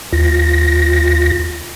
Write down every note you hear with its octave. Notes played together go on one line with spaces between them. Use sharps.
D#2 F4 A#6